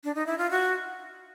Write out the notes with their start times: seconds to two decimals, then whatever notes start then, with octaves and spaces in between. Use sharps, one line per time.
0.04 D4
0.15 D#4
0.26 E4
0.38 F4
0.51 F#4